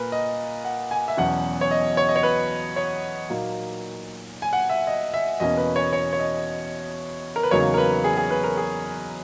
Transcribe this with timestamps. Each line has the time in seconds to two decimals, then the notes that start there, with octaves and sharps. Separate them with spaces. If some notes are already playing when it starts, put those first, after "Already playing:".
Already playing: A#2 A#4 B4
0.12 D#5
0.64 F#5
0.91 G#5
1.08 E5
1.17 E2 B2 F#3 C#4 F#5
1.61 C#5
1.71 D#5
1.97 C#5
2.09 D#5
2.16 C#5
2.23 B4
2.76 C#5
3.30 A#2 F#3 A#3 D#4
4.42 G#5
4.53 F#5
4.69 E5
4.87 D#5
5.14 E5
5.40 E2 B2 A#3 C#4 D#5
5.57 B4
5.76 C#5
5.93 C#5
6.13 C#5
6.20 D#5
7.36 A#4
7.43 B4
7.51 E2 C#3 F#3 A#3 D#4 C#5
7.74 A#4
7.78 B4
8.04 G#4
8.17 G#4
8.31 B4
8.44 A#4
8.57 G#4